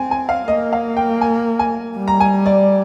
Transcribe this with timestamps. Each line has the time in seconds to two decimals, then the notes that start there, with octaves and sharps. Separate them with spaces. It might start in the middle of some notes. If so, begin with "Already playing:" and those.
Already playing: C4 G#5
0.11 G#5
0.29 F5
0.48 A#3 D#5
0.73 F5
0.97 G5
1.21 G#5
1.59 G#5
1.96 G3
2.08 A#5
2.20 G#5
2.46 D5